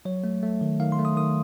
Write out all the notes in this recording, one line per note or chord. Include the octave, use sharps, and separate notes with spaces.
F#3 C#5
A3
A3
D#3
D#3 F5
C6
A3
D#6
D#3 D#6